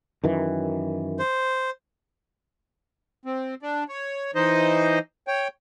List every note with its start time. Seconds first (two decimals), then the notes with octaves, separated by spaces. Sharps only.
0.24 F#2 D#3 E3
1.19 C5
3.25 C4
3.62 D4
3.89 C#5
4.35 E3 D#4 C5 D#5
5.28 C#5 G5